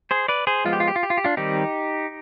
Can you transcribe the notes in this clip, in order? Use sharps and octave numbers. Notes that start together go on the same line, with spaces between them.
G#4 C5
B4 D5
G#4 C5
F3 G#3 B3 F4
G4
F4
G4
F4
G4
F4
G4
D4 F4
D#3 G3 C4 D#4 G4